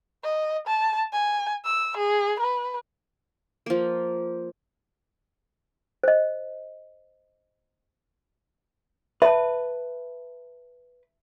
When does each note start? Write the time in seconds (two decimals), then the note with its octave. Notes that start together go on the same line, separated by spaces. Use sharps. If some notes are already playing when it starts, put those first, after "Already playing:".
0.24 D#5
0.67 A5
1.13 G#5
1.65 E6
1.97 G#4
2.40 B4
3.66 F3 A#3
6.03 C5 D#5
9.22 B4 E5 A5